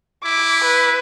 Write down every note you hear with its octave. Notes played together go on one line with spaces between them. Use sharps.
E4 D6
B4